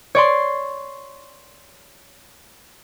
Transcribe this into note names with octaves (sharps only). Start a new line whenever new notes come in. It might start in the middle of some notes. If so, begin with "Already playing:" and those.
C#5 D5 C6